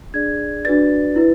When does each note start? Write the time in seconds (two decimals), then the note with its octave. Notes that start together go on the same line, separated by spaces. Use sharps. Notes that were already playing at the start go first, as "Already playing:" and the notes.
0.14 D4 G#4 D5 G#6
0.65 D4 F#4 B4 D5 A6
1.16 E4 B4